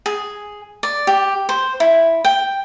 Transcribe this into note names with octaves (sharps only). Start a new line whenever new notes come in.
G#4
D5
G4
C5
E4
G5